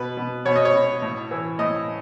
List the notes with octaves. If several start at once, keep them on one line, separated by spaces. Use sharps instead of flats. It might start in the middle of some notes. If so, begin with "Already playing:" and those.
Already playing: B2 B4
B2
B2 C#5
D#5
C#5
B2
A2
E3
A2 D#5